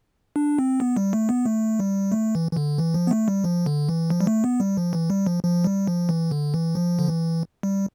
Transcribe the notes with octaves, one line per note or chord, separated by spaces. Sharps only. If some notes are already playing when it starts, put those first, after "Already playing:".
D4
C4
B3
G3
A3
B3
A3
G3
A3
E3
E3
D3
E3
F3
B3
A3
G3
F3
D3
E3
F3
G3
A3
B3
G3
F3
E3
G3
F3
F3
G3
F3
E3
D3
E3
F3
D3
E3
G3